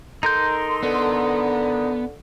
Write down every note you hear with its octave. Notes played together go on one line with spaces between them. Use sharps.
D#4 A4 A#4 C6 G6
D3 B3